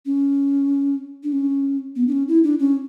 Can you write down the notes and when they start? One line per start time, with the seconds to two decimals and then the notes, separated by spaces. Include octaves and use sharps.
0.06 C#4
1.24 D4
1.32 C#4
1.96 B3
2.07 D4
2.12 C#4
2.28 E4
2.44 D4
2.60 C#4